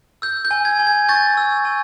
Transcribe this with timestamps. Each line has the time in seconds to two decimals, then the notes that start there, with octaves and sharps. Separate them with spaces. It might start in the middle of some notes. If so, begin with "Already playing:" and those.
0.22 E6 G6
0.45 G6
0.51 G#5
0.65 G#6
0.79 G#5
0.87 G#6
1.09 C#6 G6 A6
1.37 E6
1.65 G#5